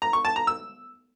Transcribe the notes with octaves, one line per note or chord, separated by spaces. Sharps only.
A#5
C#6
A5
A#5
E6